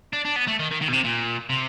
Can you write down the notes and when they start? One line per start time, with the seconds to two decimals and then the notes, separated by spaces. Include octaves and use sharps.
0.13 D4
0.25 D4
0.36 B3
0.47 A3
0.60 D#3
0.71 D#3
0.81 D#3
0.88 B2
0.92 C3
1.04 A#2
1.50 C3